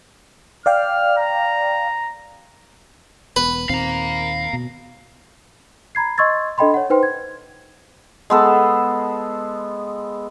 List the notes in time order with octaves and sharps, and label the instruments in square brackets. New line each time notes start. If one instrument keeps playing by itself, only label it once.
[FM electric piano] D5 F5 G5 [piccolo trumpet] F6
[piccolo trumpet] A#5
[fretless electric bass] E1 B3 [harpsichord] B4
[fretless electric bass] D#2 A#2 C4 [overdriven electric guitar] F5 A#5
[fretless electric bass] B2
[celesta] A#5 B5 G#6 C7
D#5 C6 C#6 E6 G#6 A6
D4 A4 D#5 G5 B5 C6
C#5 F#5
D#4 B4 C5 G5 C6
G#6
[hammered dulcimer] G#3 B3 A4